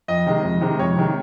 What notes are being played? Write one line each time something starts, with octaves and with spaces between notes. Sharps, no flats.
F2 D#5
C3 D#3 G#3
F2
C3 D#3 G#3
F2 C#5
C3 D#3 G#3